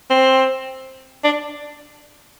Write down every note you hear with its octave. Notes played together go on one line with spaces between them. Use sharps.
C4
D4